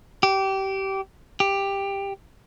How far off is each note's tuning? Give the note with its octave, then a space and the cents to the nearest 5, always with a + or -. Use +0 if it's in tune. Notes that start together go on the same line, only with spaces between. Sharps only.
G4 -20
G4 +10